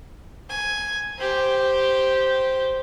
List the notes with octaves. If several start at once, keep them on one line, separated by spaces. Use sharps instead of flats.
G#5
G4 C5